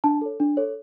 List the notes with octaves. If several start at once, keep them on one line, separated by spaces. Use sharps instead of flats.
D4 A5
A4 C#5
D4
A4 C#5